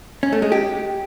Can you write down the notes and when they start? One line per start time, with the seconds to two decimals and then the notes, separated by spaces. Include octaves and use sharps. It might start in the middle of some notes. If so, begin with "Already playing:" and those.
0.23 C#4
0.33 A3
0.42 G#3
0.52 G4